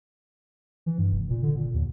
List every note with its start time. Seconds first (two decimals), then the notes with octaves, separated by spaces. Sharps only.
0.86 E3
0.98 G2
1.12 F1
1.30 A#2
1.42 D3
1.56 A#2
1.74 D#2